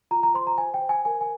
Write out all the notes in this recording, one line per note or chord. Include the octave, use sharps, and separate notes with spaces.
F4 A#5
A#5
C5 C6
A#5
C5 G#5
G5
C5
G#5
A#4 G#5
G#5